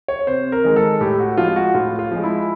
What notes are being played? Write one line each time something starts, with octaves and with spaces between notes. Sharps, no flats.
C#5
C3 C5
A#4
D#3 G#3
A4
A2 G4
F#4
F3 G#3 F4
F#4
A2 F4
F4
F3 G#3
E4